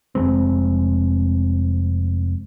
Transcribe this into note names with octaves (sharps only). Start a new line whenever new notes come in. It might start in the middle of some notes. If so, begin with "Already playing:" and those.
F1 G#3 C4